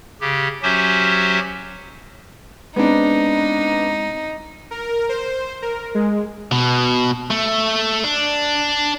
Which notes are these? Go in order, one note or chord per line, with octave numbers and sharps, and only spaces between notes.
C#3 G4
F#3 C#4 F#4 G4 C5 E5
G#3 B3 C4 D4 D#4
A#4
C5
A#4
G#3
B2
A3
D4